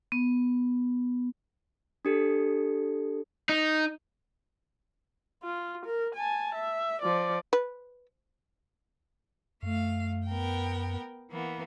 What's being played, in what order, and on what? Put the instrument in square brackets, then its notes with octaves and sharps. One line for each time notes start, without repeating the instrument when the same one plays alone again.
[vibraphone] B3
[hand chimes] D4 G4 A4
[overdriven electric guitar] D#4
[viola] F4
A#4
G#5 A5
E5
F3 D5
[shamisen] B4
[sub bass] F#2 [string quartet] A3 F5
[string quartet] B3 A#4 G5
E3 A#3 B3